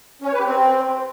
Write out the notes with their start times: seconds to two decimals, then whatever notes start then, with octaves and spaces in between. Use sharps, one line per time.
0.22 C#4
0.28 C#5
0.33 B4
0.39 G4
0.45 C4